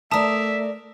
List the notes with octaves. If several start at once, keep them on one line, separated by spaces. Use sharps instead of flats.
A3 A#4 D5 E5 A5 D#6